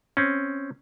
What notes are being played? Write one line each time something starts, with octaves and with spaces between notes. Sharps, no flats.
C4 C#4